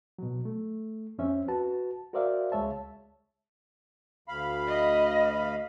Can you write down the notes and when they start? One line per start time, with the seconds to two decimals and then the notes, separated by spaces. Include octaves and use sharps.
0.19 B2 F#3
0.45 A3
1.18 F2 C4 C#4 E5
1.48 F#4 B4 A5
2.13 F#4 A#4 C5 D5 E5 F5
2.52 C#2 G#3 C#5 E5 A5
4.28 D2 F5 B5
4.68 D#5